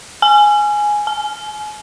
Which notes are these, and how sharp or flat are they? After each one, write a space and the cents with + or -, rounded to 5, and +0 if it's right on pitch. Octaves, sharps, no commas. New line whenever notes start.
G#5 +5
G#5 +35